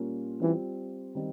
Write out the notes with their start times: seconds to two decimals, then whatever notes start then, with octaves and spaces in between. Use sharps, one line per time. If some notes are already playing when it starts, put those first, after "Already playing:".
Already playing: A#2 G3 A#3 C#4 F4
0.41 E3 G3 C4 F4
1.15 D#3 G3 C4